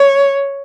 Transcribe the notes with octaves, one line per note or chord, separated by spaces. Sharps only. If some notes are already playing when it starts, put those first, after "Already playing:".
Already playing: C#5